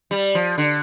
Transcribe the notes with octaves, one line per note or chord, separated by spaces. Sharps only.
G3
F3
D3